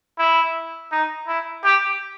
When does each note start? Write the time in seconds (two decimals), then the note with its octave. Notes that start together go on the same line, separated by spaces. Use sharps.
0.19 E4
0.92 D#4
1.28 E4
1.65 G4